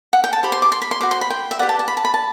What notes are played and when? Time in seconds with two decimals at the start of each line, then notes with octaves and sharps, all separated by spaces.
0.13 F#5
0.24 G5
0.33 A5
0.43 G4 C5 B5
0.52 C6
0.62 D6
0.72 C6
0.82 B5
0.91 C6
1.01 F#4 C5 D6
1.11 C6
1.21 B5
1.30 G5
1.51 E5
1.59 G4 B4 D5 F#5
1.69 A5
1.79 A5
1.88 B5
1.97 A5
2.05 B5
2.14 A5